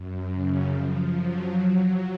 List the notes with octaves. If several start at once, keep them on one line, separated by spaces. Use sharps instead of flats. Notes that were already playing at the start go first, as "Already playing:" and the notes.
Already playing: F#2
C#3
F3
F#3
F#3